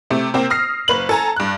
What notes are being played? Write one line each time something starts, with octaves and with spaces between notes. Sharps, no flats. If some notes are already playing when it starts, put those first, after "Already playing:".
C3 A3
C3 A#3 C4 G4
D#6 F6 A#6 C7
F#1 B4 F#7
A4 G#5 A#5
G2 F#6